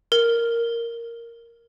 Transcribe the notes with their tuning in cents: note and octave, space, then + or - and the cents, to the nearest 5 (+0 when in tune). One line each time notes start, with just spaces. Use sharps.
A#4 -5